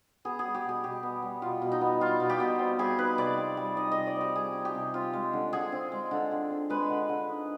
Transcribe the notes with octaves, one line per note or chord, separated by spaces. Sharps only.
B3 G#4
G#4
G3
G4
B2 G#4
B2 G4
B3
G3
B2 F4
B2
D#4
B3
G3 F4
B2
G4
B2
C4
G3 G#4
D#4 B4
C3 D5
C4
G3
D#4 D#5
C3 D#5
D5
C4 G4
G3 G#4
D#4
G4
C3
C4 F4
G#3
D3
D3 G#4
C4
G#3
D3
D3
C4
G#3 B4
D3
D3
D#4